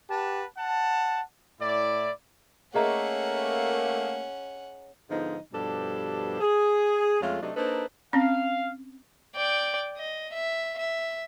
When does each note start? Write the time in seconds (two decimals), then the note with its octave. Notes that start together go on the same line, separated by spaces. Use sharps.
0.10 G4 B4 F#5 A5
0.58 F#5 A5
1.61 A2 E4 D5
2.75 A3 A#3 C#4 G#4 D#5 F#5 A#5
5.09 G#2 D3 F3 G#3 B3 D#4
5.53 G2 B2 F3 D4 G4 A4
6.41 G#4
7.21 F2 G#3 A3 C#4 F4
7.41 C3 F#3 A3 D4 D#4
7.56 A#3 D4 D#4 A4 B4 C5
8.13 C4 C#4 F5
9.35 D5 G5
9.97 D#5
10.33 E5
10.78 E5